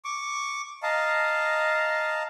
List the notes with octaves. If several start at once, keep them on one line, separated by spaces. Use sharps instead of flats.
C#6 D6
D#5 F5 A5 A#5